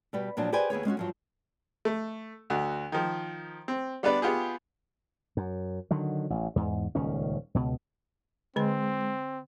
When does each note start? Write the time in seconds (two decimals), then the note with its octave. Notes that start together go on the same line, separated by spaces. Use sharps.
0.13 B2 G3 B3
0.37 A#2 F3 F#3 D4
0.52 G4 G#4 B4 C5 D5 G#5
0.70 D#2 B3 G#4 C#5
0.85 G#3 C#4 F4 F#4
0.97 G2 F3 F#3
1.85 A3
2.50 D2 F#4
2.92 D#3 F3
3.68 C4
4.03 G3 B3 D4 B4 D5
4.22 B3 F4 G4 G#4
5.37 F#2
5.91 D3 D#3 F#3
6.30 A1
6.56 E2 G#2
6.95 D#1 C#2 D#3 C#4
7.54 C#2 B2
8.56 D3 G#3 C4 B4